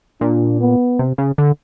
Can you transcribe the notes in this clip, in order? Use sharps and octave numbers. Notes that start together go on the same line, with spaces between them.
A#2 D4
B3
C3
C#3
D3